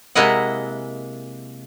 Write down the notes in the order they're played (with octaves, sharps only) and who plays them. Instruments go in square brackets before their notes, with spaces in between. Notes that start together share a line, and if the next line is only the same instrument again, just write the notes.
[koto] C3 G#3 A#3 E4 D#5 F#5